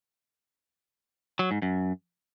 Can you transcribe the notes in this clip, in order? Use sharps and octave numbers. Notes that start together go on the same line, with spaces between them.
F#3
G#2
F#2